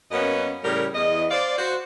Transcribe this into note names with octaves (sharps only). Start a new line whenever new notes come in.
F#2 A#3 B3 C#4 F#4 D#5
A2 C#3 G3 C#4 A#4
E2 D#5
C5 D5 F5
F#4 C5